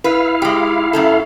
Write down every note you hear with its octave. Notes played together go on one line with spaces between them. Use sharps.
E4 B4 F5
G#3 G4
F#2 A3 A4